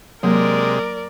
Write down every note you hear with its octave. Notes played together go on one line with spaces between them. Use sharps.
C3 F#3 G#3 A#3 A#4 D5